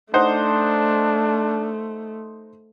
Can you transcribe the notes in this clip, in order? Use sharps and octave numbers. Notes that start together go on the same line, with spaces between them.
A3 D4 D#4 C5 F#5